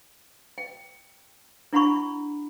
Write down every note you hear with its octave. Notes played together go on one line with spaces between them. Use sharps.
G5
D4 E4 F#5 A#5 B5 C#6